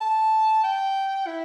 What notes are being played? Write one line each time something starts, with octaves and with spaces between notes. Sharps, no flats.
A5
G5
E4